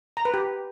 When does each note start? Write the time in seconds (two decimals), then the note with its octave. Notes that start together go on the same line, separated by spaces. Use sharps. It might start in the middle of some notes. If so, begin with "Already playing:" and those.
0.17 A#5
0.25 B4
0.34 G4